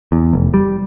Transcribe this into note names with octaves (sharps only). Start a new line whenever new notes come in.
E2
F1
G3